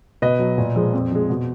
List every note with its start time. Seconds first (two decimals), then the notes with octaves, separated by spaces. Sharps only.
0.22 B2 B4 D#5
0.39 F#3
0.58 A#2
0.76 F3 G#3
0.93 F2
1.11 F3 G#3
1.30 B2